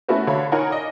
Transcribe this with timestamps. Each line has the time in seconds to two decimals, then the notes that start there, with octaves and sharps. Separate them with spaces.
0.08 A3 B3 C#4 E4 F#4 B4
0.27 D3 C#5 F5 B5
0.52 D#4 A#4 C#5 F#5 G#5
0.70 D5 D#5